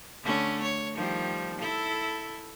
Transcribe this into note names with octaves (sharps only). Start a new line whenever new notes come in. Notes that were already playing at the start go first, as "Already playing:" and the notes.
D3 A3 C#4
C#5
D#3 F3 G3
E4 A4